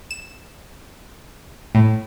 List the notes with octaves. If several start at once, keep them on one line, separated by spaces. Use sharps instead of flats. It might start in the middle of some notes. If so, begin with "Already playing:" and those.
E7
A2